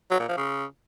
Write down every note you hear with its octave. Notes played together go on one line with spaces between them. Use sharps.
F#3
A#2
F3
C#3